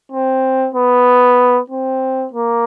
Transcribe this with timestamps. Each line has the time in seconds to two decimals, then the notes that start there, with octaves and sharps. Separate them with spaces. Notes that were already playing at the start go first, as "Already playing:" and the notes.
0.12 C4
0.75 B3
1.70 C4
2.33 A#3